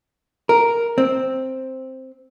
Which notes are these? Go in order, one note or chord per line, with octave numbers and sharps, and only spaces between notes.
A#4
C4